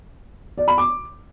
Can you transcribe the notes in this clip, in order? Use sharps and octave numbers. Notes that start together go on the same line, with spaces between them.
D5
B5
D6